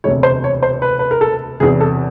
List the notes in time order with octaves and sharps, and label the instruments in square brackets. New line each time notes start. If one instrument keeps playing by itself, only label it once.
[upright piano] E1 D2 C3 C#5
C5
C#5
C5
B4
B4
A#4
A4
E1 E2 C3 G#4
A4